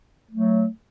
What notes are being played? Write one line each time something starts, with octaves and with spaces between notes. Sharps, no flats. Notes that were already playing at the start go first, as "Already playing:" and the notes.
F#3 A3